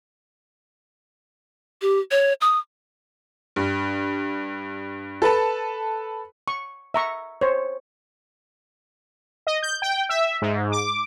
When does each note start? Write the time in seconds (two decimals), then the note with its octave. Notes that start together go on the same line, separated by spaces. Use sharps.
1.82 G4
2.11 C#5
2.41 D#6
3.56 G2
5.22 A4 B4 A5
6.48 C#6
6.94 E5 A#5 C#6
7.41 C5 C#5
9.47 D#5
9.63 G6
9.82 G5
10.09 E5
10.42 G#2
10.72 D6